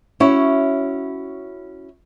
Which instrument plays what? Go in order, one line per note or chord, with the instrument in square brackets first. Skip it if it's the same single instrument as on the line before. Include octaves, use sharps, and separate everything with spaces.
[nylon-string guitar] C#4 E4 F#4 C#5